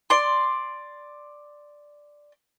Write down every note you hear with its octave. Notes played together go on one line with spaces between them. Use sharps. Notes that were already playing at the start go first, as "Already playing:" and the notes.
D5 C6